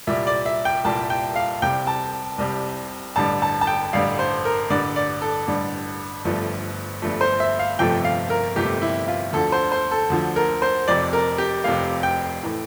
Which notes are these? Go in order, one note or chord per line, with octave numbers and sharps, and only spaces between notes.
C2 A#2 G3 E5
D5
E5
G5
C2 A#2 G3 A5
G5
F5
C2 C3 G3 G5
A5
C2 C3 G3
A1 G2 D3 G3 A5
A5
A5
G5
A1 G2 D3 G3 F5
C5
A#4
A1 G2 D3 G3 D5
D5
A4
A1 G2 D3 G3
G1 G2 F3 A3
G1 G2 F3 A3
C5
E5
F5
G1 F2 C3 F3 A3 G5
F5
A#4
G1 F2 C3 F3 A3 G4
E4
F4
D2 D3 F3 A4
C5
C5
A4
D2 D3 F3
A#4
C5
F1 F2 C3 D5
A#4
G4
F1 F2 C3 F5
G5
A2 E3 A3